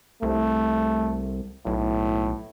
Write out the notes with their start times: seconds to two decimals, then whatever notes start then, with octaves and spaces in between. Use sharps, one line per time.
0.22 C2 A3
1.66 B1 A2